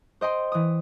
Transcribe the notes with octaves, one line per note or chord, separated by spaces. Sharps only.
C5 D#5 G5 C6
E3 D#6